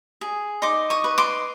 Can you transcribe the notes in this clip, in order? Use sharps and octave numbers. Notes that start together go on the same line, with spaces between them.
G#4
D#4 C6 D6
C#6 D#6
B4
C6 D6